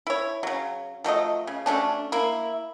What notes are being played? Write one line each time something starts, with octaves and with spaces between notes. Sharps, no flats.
E4 C#5
C#3 F#3
F3 F#3 A3 D#5
C#3
F#3 A3 C#4 D4
A#3 E4